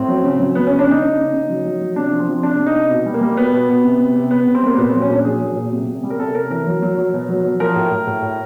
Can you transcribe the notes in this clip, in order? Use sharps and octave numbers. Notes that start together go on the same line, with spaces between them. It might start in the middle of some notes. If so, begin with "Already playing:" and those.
Already playing: A2 C4
F#3
C#3
F#3
F#3 B3
C#3 C#4
D4
C#3 D#4
C#3
C#3
C#3
F#3
F#3
F#3
C3 D4
F3
C4
F3
C3 D4
C3
D#4
C3
B2
G3
A#3
G3
B2 B3
B2
B2
C3
C3
C3
C3 B3
C3
C4
G3 A#3
A#2 B3
F#3 C4
C#4
A#2 D4
F#3 G#4
F#3
A#2
C3
C3
G3
A#4
C3 A4
C3 A#4
E3 A#4
F#3
F#3
F#3
B2
F#3
F#3
F3 A#4
A2
A2
A2
A2